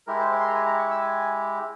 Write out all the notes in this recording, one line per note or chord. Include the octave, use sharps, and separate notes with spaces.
G#3 E4 G4 A#4
C5
A#4
C6
A#5
G#5
A#5
C#6
E6
G#5